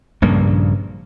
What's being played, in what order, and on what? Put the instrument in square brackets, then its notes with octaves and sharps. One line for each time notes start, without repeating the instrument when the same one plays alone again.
[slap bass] A#1 G2 C#3 A#3